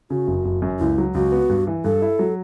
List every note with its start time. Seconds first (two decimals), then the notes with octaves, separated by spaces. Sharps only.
0.10 C#3 F#4
0.27 F#1
0.45 F#1
0.62 F#2
0.79 C#2 E4
0.98 F#3
1.15 C#2 F#4
1.32 B3
1.50 G2
1.67 E3
1.84 G2 A4
2.02 E4
2.19 F#3